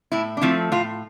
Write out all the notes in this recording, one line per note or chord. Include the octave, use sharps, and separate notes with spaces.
A2 E4
D4
F3 A3 C4 E4
A2 F4